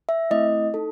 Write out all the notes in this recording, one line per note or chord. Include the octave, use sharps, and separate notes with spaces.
E5
A3 C4 E4 D#5
D#4 A4